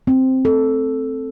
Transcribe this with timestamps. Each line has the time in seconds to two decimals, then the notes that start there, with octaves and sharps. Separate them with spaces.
0.07 C4
0.45 A4